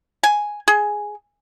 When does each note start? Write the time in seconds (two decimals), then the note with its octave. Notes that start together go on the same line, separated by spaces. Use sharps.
0.23 G#5
0.68 G#4